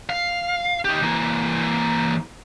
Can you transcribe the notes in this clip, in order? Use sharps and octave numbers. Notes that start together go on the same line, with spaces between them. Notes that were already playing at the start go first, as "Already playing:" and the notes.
F5
D#4 G4
E3 A#3